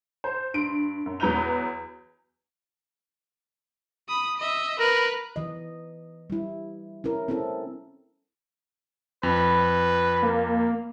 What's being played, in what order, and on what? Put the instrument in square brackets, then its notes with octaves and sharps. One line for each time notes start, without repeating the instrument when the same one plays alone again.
[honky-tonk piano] C5
G2 C6 D7
F#2
E2 F#3 B4 A#5 G6 F7
[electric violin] B5 D#6
D#5 E5
[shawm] A#4 [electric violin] B4 F#6
[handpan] E3 D#5
G3 E4
C#4 E4 A#4
C4 C#4 E4 A4
[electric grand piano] F2 [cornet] B4
[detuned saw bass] A#3